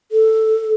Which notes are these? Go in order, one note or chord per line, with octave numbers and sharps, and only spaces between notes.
A4